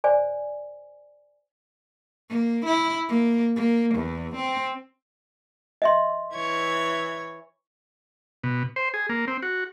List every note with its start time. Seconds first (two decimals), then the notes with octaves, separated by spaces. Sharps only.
0.04 C5 D5 G#5
2.30 A#3
2.66 E4
3.09 A#3
3.56 A#3
3.95 E2
4.36 C4
5.82 D#5 E5 C6
6.32 E3 C#5 G#6
8.44 B2
8.76 C5
8.94 G#4
9.09 A#3
9.27 C4
9.43 F#4